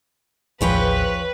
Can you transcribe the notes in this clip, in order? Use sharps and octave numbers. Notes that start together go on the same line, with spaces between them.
A1 D#2 F3 G#4 B4 C#5 G5